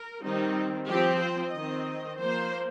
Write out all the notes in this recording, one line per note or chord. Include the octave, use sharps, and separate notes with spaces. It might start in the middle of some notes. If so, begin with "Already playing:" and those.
Already playing: A#4
D#3 G3 C4 D#4
F3 C4 G4
C5
D#3 C4 D#5
F3 A#3 C5